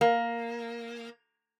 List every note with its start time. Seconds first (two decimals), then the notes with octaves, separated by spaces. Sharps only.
0.01 A#3